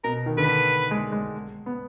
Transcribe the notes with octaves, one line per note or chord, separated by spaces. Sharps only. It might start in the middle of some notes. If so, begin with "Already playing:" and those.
B2 A#4
D#3
D3 B4
G#3
G#3
B3